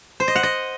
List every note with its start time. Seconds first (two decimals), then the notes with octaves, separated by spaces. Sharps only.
0.20 C5
0.28 D#5
0.36 F#5
0.43 D#5